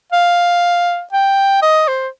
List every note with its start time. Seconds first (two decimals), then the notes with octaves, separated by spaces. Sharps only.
0.12 F5
1.13 G5
1.62 D#5
1.88 C5